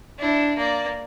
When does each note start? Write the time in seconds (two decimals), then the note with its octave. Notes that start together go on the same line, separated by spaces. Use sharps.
0.18 D4 E4
0.57 A#3 D5